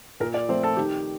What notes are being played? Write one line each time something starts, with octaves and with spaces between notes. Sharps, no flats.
A#2 A#4
D5
F3 A3 C4 C5
A4
D#3 G4